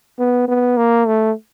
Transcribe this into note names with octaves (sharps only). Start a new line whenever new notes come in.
B3
B3
A#3
A3